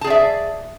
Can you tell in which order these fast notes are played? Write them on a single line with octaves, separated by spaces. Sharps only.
A5 G#4 D5 E5